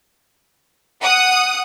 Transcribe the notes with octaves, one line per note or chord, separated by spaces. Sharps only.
F#5 D#6